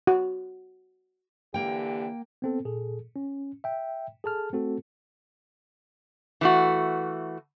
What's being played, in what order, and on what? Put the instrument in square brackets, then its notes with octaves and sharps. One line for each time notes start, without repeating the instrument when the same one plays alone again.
[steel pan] F#4
[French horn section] D3 E3 G4 [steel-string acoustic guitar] A#3 G5
[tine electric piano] B3 C4 A4
A#2 G#4 A4
C#4
E5 G5
G#4 A4 A5 F6
A3 C4 F#4 A4
[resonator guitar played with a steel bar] E3 A3 F#4